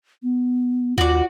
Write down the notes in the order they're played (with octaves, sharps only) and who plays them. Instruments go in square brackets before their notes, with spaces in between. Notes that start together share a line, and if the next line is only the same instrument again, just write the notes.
[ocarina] B3
[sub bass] D#2 [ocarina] F4 [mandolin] F#4 D5